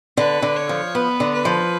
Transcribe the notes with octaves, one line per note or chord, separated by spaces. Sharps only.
D3 B4
D3
C#5
F3
B3 B4
D3
B4
F3